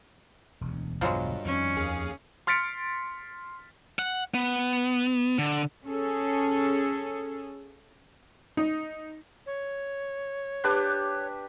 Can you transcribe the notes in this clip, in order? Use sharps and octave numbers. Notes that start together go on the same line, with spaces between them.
E1 D2
E1 B1 G2 D3 F3 F#3 G#3
F2 D#3 C#4
D#2 G#4 F5
C6 F6 A6 B6 C#7 D7
F#5
B3
D3
C#4 G#4 A4
D#4
C#5
D4 G4 B4